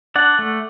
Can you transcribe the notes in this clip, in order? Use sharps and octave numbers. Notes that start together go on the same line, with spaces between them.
D4 D5 F#5
A3